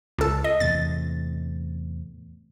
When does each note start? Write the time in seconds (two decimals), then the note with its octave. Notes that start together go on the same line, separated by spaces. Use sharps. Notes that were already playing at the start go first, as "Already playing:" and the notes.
0.18 C#2 A4
0.44 D#5
0.60 E2 A2 C3 A6